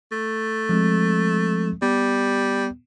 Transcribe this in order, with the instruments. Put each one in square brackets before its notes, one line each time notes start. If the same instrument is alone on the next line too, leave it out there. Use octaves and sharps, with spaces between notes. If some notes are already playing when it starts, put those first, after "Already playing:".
[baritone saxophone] A3
[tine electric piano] F3 G#3 C4
[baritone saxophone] G3 [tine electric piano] B3